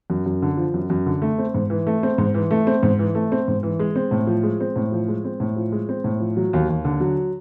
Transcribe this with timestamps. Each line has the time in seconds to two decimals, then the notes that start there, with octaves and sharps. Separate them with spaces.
0.10 F#2
0.26 F#2
0.42 D3
0.57 F3
0.74 F#2
0.90 F#2
1.06 D3
1.22 A3
1.38 C4
1.54 G#2
1.70 E3
1.87 A3
2.03 C4
2.18 G#2
2.34 E3
2.51 A3
2.67 C4
2.83 G#2
2.99 E3
3.15 A3
3.32 C4
3.48 G#2
3.63 E3
3.79 G#3
3.96 C4
4.11 A2
4.27 F3
4.43 G#3
4.60 C4
4.76 A2
4.92 F3
5.08 G#3
5.25 C4
5.40 A2
5.56 F3
5.72 G#3
5.89 C4
6.04 A2
6.20 F3
6.37 F#3
6.53 D#2
6.69 D#2
6.85 D3
7.00 F#3